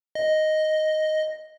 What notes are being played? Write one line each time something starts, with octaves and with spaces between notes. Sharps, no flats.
D#5